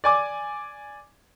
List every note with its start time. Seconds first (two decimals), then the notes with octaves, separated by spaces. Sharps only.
0.04 D5 G#5 D6